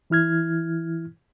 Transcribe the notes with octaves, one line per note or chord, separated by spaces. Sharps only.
E3 E4 F6 G#6